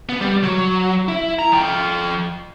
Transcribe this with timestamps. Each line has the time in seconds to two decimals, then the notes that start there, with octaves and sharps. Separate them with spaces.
0.09 B3
0.21 G3
0.43 F#3
1.08 E4
1.39 A#5
1.52 F3 G5